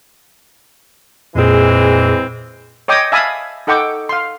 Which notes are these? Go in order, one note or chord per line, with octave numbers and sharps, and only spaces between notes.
F2 A#2 E3 G#3 C4 G#4
C#5 D#5 G5 D6 D#6
E5 F5 G#5 A5 B5 D#6
D#4 A4 F#5 G5 C#6 D6
F5 C6